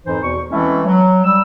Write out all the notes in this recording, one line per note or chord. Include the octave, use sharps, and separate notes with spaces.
F2 G#2 E3 D#4 C5
E2 B2 C#6
E3 G#3 A3 C4 C#4 E4
F#3
G3 E6